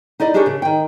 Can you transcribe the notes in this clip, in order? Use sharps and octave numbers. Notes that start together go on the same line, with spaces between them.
D#4 E4 D5 D#5
D4 G4 G#4 A#4 C#5
C#3
D#3 G5